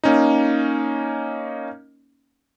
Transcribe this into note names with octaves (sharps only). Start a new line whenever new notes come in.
A#3 C#4 D#4